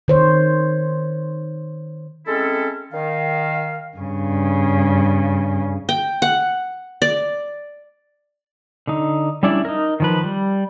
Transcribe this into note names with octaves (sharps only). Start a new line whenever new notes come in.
D#3 C5 C#5
G#3 C4 C#4 E4 A4
D#3 F5
G2 C#3
G5
F#5
D5
D3 D#4
G3 C#4 D4 E4 D5
D#4 A#4
D#3 F3 B4
G3